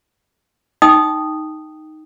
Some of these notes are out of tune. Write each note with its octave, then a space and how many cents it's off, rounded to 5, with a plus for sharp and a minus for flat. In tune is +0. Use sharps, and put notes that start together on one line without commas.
D#4 +0 G5 +0 D#6 -10